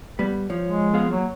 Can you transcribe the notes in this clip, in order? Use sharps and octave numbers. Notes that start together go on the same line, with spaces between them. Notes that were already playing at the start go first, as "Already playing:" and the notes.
G3 B3
F3 C#5
G#3
B3 G#4 F5
F#3 A#3